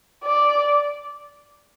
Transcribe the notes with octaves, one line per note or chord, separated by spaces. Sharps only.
D5